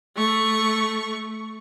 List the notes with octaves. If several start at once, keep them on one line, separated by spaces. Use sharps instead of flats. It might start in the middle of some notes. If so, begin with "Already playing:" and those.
A3 C#6